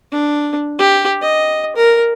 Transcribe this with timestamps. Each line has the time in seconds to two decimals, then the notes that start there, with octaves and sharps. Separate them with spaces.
0.12 D4
0.79 G4
1.22 D#5
1.76 A#4